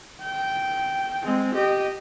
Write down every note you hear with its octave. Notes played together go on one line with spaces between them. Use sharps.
G5
G#3 C4
G4 D#5